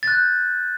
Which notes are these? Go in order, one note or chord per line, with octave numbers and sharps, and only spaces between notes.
F#6 G6 A6